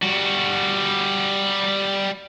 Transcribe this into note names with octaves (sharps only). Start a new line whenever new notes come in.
G3 F#4